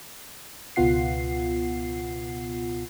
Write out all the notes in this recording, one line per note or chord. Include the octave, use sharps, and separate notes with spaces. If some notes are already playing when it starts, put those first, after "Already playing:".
C#2 B2 B3 F4 F#5 C7